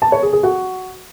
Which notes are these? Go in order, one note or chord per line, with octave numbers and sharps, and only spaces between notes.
A5
C#5
G#4
G#4
F#4